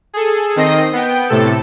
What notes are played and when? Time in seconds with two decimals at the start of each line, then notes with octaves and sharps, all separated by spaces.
0.14 G#4 A4
0.56 D#3 C4 D#5 A#6 C7
0.93 B3 G5
1.30 A2 C3 A4